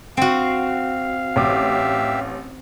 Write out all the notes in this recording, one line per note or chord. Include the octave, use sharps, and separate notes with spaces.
C4 F#4 F5
A1 G4 E5 D6